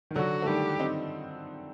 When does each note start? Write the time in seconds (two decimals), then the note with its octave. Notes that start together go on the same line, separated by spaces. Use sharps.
0.11 D#3
0.15 D3 F#3 F#4
0.42 A3
0.47 D#3 G3 G4
0.79 C4 D#4